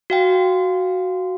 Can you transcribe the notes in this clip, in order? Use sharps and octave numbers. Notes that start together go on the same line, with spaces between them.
F#4 F5 G5